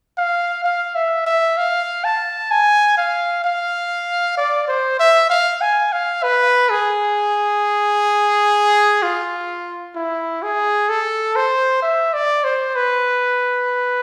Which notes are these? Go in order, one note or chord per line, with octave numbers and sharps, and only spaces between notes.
F5
F5
E5
E5
F5
A5
G#5
F5
F5
D5
C5
E5
F5
G#5
F5
B4
G#4
F4
E4
G#4
A4
C5
E5
D5
C5
B4